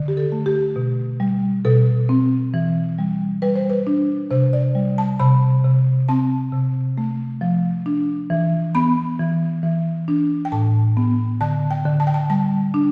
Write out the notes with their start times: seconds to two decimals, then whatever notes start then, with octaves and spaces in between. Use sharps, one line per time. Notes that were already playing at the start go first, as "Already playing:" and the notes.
Already playing: D3
0.08 G4
0.17 A4
0.32 A3
0.46 G4
0.76 B2
1.20 G3
1.65 B2 A4
2.09 C4
2.54 E3
2.99 G3
3.42 G3 B4
3.56 C5
3.70 B4
3.87 D4
4.31 C3 C5
4.53 D5
4.75 G3
4.98 A5
5.20 C3 B5
5.64 C3
6.09 C4 A5
6.52 C3
6.98 A3
7.41 F3
7.86 D4
8.30 E3
8.75 B3 B5
9.19 E3
9.63 E3
10.08 D4
10.45 G5
10.52 A2 A5
10.97 B3
11.41 D3 A5
11.71 G5
11.85 D3
12.00 A5
12.07 G5
12.14 A5
12.30 G3 A5
12.74 D4